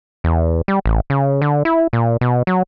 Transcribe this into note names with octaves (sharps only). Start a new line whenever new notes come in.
E2
G3
A1
C#3
D3
E4
A#2
B2
F#3